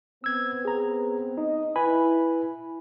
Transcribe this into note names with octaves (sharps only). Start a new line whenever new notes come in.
B3 C4 E6 G#6
G#4 A#5
D#4 D#5
E4 B4 G#5 B5